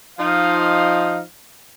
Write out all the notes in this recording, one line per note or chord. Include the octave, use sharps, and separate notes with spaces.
F3 D#4 F5